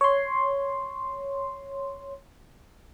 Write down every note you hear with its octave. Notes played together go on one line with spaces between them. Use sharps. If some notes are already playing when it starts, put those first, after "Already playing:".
C#5 C6